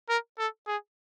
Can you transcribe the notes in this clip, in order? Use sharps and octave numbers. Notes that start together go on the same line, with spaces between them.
A#4
A4
G#4